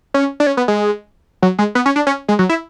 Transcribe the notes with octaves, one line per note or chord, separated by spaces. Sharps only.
C#4
D4
C#4
B3
G#3
F#3
G#3
B3
C#4
D4
C#4
G#3
F#3
E4